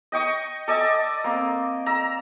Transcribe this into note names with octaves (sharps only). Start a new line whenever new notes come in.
D#5 G5 C#6 D#6
A4 D5 D#5 G#5
A#3 C4
A#5 E6